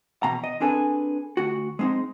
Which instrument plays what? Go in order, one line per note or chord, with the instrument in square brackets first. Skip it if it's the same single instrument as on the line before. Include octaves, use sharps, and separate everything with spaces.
[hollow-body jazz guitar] E2 B2 A#5
D#5
C4 D4 G#4 A4 B4
D2 F#4
G#3 C4 D#4